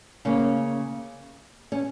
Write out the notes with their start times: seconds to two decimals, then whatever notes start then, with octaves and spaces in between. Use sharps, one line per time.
0.25 C#3 A#3 C#4
1.72 C#4